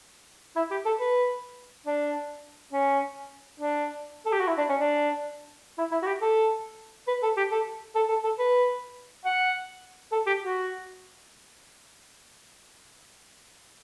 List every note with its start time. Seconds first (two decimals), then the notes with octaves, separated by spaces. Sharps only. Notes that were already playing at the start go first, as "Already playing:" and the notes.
0.56 E4
0.70 G4
0.85 A4
1.00 B4
1.86 D4
2.73 C#4
3.60 D4
4.26 A4
4.32 G4
4.40 F#4
4.47 E4
4.57 D4
4.69 C#4
4.80 D4
5.78 E4
5.91 E4
6.03 F#4
6.06 G4
6.21 A4
7.08 B4
7.23 A4
7.37 G4
7.51 A4
7.95 A4
8.09 A4
8.24 A4
8.39 B4
9.25 F#5
10.12 A4
10.26 G4
10.41 F#4